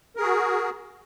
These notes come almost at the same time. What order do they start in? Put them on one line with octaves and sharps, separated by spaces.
A#4 G#4 F#4